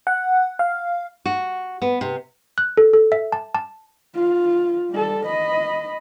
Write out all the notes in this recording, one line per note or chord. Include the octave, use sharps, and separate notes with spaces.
F#5
F5
F#4
B3
C3
F#6
A4
A4
E5
A5
A5
F4
G3 A4
D#5 B5